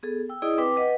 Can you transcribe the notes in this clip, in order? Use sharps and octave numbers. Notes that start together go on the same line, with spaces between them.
B3 G#4 A4
G5 E6
E4 G#4 D5 D#5 D#6
C4 B4 G5 D6
B4 D#5 F#5